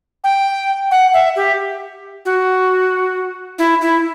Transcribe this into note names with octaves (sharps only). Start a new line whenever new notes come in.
G5
F#5
E5
G4
F#4
E4
E4